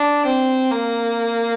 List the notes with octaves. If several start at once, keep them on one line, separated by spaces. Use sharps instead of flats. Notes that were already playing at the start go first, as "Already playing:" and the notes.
Already playing: D4
C4
A#3